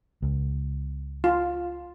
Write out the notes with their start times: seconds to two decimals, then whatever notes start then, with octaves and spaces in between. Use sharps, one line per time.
0.22 C#2
1.24 F4